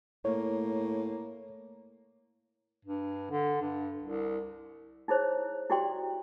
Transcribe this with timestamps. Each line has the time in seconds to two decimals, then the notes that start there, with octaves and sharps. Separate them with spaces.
0.25 A2 A#3 C#5
2.85 G2
3.31 D3
3.61 G2
4.03 C2
5.08 D#4 E4 G#4 C5 C#5
5.70 E4 F#4 G4 D5 G5 C6